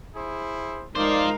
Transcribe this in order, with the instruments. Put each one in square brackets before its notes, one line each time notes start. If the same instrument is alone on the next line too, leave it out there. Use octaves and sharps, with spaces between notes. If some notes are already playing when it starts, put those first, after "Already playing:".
[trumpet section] E4 G#4 C5
[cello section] G#3 A#4 F5 [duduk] D#4 [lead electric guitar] F4 C5 [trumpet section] D5